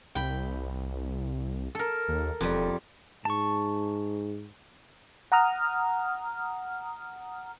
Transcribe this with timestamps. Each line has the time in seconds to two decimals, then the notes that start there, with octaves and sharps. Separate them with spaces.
0.15 C2 G5 B5
1.75 A4 A#4
2.08 D#2
2.41 E1 F2 G3
3.25 G#2 A5 C#6
5.32 F#5 A#5 D#6 F6